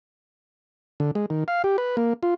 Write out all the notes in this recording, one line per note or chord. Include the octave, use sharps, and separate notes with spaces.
D3
G#3
D#3
F5
G4
B4
A#3
F4